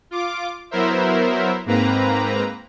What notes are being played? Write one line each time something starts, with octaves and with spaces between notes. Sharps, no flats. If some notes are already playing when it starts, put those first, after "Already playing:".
F4 D6
F#3 B3 E4 A#4 C5 E5
G#2 A#3 C4 B4 A#5